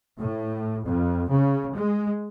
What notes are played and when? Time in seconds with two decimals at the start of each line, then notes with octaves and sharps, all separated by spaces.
0.19 A2
0.86 F2
1.29 C#3
1.74 G#3